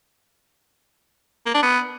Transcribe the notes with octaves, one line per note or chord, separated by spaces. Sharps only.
A#3
D4
B3